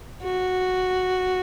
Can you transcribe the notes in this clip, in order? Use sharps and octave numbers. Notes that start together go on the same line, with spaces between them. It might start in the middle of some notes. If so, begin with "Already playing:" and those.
F#4